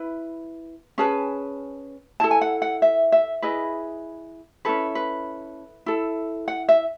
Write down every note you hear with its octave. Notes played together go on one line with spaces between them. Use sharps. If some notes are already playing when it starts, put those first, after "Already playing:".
Already playing: E4 B4
C#4 G#4 B4 A5
E4 A4 A5
G#5
F#5
F#5
E5
E5
E4 G#4 B4 D#5
C#4 E4 A4 B4
B4
E4 A4
F#5
E5